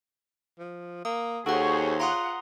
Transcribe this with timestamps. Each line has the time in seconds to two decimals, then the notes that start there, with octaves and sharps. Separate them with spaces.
0.59 F3
1.05 A#3 D#6
1.46 D#2 F#4 G#4 A4 C5 C#5 F#5
2.00 F4 F#5 A#5 C6 D#6